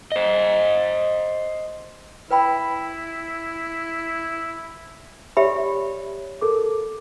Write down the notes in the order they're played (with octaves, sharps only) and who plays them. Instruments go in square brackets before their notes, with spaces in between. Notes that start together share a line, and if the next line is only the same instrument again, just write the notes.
[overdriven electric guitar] C5 D#5
[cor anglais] E4 [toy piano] B4 G5 B5
[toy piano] G4 E5 B5 [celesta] C#5 D5
[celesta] A4 A#4 D6